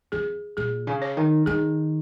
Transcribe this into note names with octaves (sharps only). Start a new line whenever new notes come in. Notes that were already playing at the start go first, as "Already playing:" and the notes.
F2 G#4
A#2 G#4
C#3
C#5
D#3
D#3 G#4